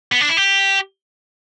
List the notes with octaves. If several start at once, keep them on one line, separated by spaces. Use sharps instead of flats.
B3
D4
E4
G4